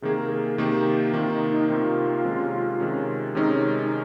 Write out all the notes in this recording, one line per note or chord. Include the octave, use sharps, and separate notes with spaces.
C3 D#3 A#3 G#4
A#4
G#4
C3 D#3 A#3 G4
C3 D#3 A#3 F4
D#4
D#4
C3 D#3 A#3 F4
C3 D#3 G#3 C#4
C3 D#3 G#3 C#4
C3 D#3 G#3 C#4 D#4
D#4